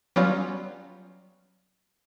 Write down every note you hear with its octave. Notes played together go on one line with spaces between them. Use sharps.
F#3 G3 B3 C#4 F4